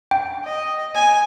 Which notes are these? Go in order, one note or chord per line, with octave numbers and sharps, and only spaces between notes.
G5
D#5
G#5